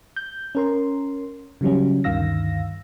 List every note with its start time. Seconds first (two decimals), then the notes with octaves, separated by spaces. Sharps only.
0.16 G6
0.55 C#4 A#4 C6
1.61 C#3 E3 F#3 G3 C#4
2.04 D2 G2 D#3 F5 E6 A#6